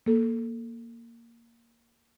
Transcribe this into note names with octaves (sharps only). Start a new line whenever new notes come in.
A#3 A4